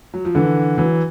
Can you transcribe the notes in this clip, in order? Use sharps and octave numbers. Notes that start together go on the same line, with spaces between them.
F#3
F3
D3 E3
E3 F#3